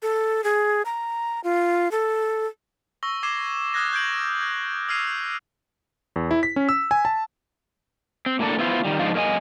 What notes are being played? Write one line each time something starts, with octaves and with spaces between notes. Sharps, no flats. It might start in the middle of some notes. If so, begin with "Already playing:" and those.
A4
G#4
A#5
F4
A4
C#6 E6 A#6 G7
D6 G#6 C7 E7 G7
D#6 F6 F#6 G#6 A#6 E7
G6 G#6 D7 F#7
F#6 G#6
E6 F6 G#6 C7 D#7 F7
E2
E4
B6
C#4
E6
G#5
A5
C4
A2 A#3 D4 A4
B3 E4 F4 C5
D#3 G3
G#2 F3 D4 D#4 F4
F#2 A#3 D4 D#5 G#5